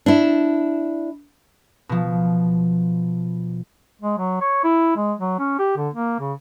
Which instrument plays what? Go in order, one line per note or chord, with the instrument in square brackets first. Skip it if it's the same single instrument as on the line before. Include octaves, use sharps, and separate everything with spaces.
[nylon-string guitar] D4 E4
[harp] B2 F3
[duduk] G#3
F#3
C#5
E4
G#3
F#3
C#4
G4
D3
A#3
C#3